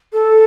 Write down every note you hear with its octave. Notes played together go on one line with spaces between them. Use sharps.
A4